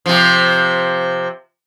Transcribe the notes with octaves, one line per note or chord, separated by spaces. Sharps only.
C3 F3